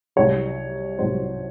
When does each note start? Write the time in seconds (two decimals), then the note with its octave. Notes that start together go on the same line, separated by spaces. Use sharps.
0.16 C2 C3 F#3 C#5
0.98 C2 C3 F#3 C5